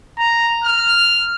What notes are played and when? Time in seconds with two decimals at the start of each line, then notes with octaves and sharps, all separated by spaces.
0.19 A#5
0.64 F6